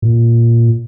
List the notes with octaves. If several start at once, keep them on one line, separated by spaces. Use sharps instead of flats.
A#2